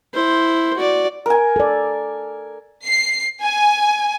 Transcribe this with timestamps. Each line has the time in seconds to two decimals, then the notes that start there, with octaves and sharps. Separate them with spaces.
0.14 E4 C5
0.77 F#4 D5
1.26 A#4 G#5
1.56 A4 D5
2.86 C7
3.42 G#5